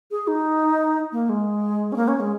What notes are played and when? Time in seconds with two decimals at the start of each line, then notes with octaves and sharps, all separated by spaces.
0.11 G#4
0.28 D#4
1.12 A#3
1.29 G#3
1.92 C#4
1.96 A#3
2.08 C#4
2.20 G#3